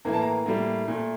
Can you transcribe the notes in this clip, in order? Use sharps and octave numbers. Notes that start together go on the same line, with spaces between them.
A2 E3 A#3 A#5
A5
A#5
A2 G3 A#3
A#2 A3